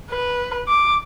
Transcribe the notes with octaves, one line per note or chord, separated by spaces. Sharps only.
B4
D6